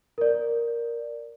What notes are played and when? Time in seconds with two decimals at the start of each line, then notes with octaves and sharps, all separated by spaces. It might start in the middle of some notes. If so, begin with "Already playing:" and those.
0.18 A#4 D5